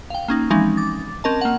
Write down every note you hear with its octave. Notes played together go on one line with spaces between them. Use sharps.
F5 G5
A#3 C#4 D#4
E3 F3 G#3 C4 C#4 D#4
D6 A6
C4 C#4 A#4 D#5 A5
A#3 F#5